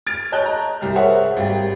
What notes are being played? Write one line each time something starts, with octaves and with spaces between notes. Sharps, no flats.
F6 G#6 A6 D7
C#5 D#5 A5 F#6 G6
A#5
C2 G3 F6
G#4 A#4 C5 C#5 E5 F#5
G#1 G3 G4